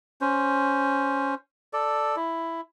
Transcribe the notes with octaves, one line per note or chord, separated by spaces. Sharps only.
C#4 C5
A4 D5
E4